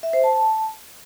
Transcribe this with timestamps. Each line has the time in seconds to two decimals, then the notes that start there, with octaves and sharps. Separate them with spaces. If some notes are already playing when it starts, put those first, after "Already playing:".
0.03 E5
0.13 C5
0.24 A5